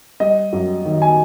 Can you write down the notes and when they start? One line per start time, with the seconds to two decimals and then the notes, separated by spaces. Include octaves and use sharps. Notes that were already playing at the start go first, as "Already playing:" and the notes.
0.20 G3 D#5
0.53 F#2
0.85 D#3
1.02 G#5